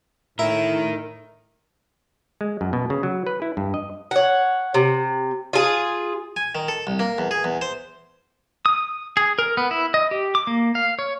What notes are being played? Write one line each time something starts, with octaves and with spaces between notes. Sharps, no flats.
A2 D#4 E4 A#4
G#3
F#2
B2
C#3
F#3
B4
E4
G2
D#5
C#5 F#5
C3
F4 G#4
G#5
D#3
A4
C2
A#3
E2
G#4
E2
C5
D#6
G#4
A#4
B3
E4
D#5
G4
D6
A#3
F5
C#5